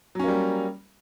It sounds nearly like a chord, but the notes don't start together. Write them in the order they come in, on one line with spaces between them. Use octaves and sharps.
F#3 C#4 A#3 G3